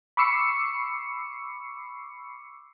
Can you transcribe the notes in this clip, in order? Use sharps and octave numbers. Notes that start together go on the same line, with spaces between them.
B5 C#6 D6 E6 C7 C#7